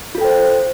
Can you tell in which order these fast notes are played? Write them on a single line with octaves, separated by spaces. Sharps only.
F4 A4 G5 C5